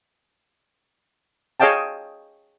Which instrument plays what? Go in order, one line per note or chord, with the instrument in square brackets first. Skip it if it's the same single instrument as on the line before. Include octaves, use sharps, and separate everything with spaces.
[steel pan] G#4 C#5 D#5 F5 G5 A5